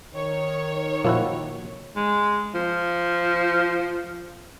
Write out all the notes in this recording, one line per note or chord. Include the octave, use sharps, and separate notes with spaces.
D#3 C#5
A#2 F3 A#3 E4 F#4
G#3
F3